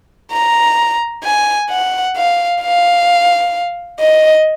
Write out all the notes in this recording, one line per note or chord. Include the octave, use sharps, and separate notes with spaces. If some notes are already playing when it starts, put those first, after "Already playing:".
A#5
G#5
F#5
F5
F5
D#5